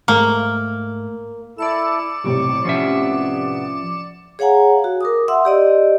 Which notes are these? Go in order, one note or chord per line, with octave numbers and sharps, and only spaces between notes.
G#2 A3 A#3
E4 A4 D5 C#7 E7
B1 A2 C3 G3 C#6 D6
F3 B3 C#4 E5
G#4 C#5 F5 F#5 G#5 A#5
F#4
A#4 D6 D#6
E5 F#5 C6 E6
G4 D5 D#5